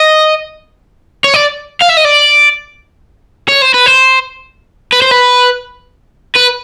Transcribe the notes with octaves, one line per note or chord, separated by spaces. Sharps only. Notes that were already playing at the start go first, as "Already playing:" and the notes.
Already playing: D#5
C#5
D5
F5
E5
D#5
D5
C#5
C5
B4
C5
B4
C5
B4
B4